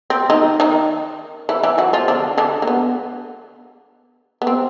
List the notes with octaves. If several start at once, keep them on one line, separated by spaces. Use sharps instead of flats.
C4
D#3 D#4
D#3 D#4
E3 E4
E3 E4
F#3 F#4
F3 F4
D3 D4
D3 D4
A#3
B3
B3
C4